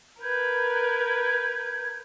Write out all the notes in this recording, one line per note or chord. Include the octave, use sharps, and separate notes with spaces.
A#4 B4 G6 G#6